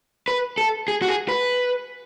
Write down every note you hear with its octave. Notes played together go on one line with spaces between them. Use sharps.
B4
A4
G#4
F#4
G#4
B4